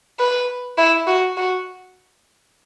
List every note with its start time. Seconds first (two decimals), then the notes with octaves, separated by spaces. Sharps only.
0.20 B4
0.78 E4
1.08 F#4
1.37 F#4